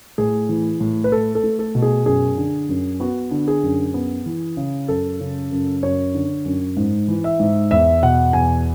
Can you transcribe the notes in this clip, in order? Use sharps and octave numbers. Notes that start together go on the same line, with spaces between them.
A2 G#4
E3
A2
B4
A3 A4
A4
A3
A4
B2
G#4
F#2 G#4
D3
F#2
B3 F#4
D3
G#4
F#2
B3
E3
C#3
F#2 A4
C#3
F#2
F#2 C#5
D3
F#2
G#2
E3
E5
G#2
E2 E5
B2 F#5
E2 G#5